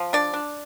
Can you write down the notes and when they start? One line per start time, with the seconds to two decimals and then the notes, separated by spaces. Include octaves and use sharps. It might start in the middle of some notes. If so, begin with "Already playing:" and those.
Already playing: F3
0.13 D4 D5
0.34 D4